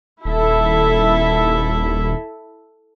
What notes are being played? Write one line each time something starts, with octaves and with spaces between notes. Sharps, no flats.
D#1 E4 A4 E5